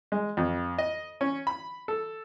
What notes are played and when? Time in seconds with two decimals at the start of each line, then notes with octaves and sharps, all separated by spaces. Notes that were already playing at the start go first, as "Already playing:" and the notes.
0.12 G#3
0.37 F2
0.78 D#5
1.21 C#4
1.47 B5
1.88 A4